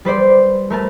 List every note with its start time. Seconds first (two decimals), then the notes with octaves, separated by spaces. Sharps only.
0.05 G3 B4 C5 D5
0.70 A3 A#4 B4 A5